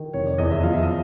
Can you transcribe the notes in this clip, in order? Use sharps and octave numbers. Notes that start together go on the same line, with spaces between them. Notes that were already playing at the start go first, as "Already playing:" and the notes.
Already playing: D#3
F1 C#5
D5
E2 D#5
E5
F3 F5
E5
D#5